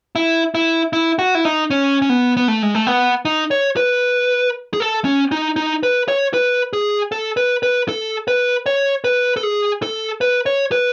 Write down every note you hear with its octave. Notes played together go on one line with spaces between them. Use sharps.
E4
E4
E4
F#4
E4
D#4
C#4
C#4
B3
B3
A3
G#3
A3
B3
D#4
C#5
B4
G#4
A4
C#4
D#4
D#4
B4
C#5
B4
G#4
A4
B4
B4
A4
B4
C#5
B4
A4
G#4
A4
B4
C#5
B4